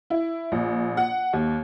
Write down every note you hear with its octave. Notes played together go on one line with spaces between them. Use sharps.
E4
A#1
F#5
D#2